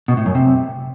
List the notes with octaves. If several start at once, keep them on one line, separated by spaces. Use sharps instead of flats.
B2
A2
F#2
C3